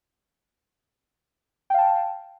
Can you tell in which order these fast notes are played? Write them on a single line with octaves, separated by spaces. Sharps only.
G5 F5 A5